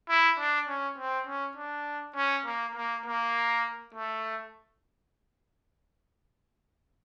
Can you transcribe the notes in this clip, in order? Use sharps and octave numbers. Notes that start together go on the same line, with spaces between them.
E4
D4
C#4
C4
C#4
D4
C#4
A#3
A#3
A#3
A3